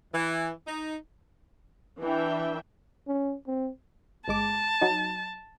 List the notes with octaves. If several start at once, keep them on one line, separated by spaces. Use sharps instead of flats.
E3
D#4
E3 D4 E5 G5
C#4
C4
G1 G#3 A5 D6
F#3 D#4